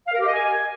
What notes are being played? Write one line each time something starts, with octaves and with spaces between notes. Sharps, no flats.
F5
A#4
G4
D#5
G#5